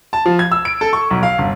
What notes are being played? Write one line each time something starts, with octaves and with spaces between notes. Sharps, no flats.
A5
F3
G#6
E6
D7
A4
C#6
B1
F5
G1